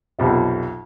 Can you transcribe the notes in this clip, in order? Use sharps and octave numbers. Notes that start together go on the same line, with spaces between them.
B1 F2 C3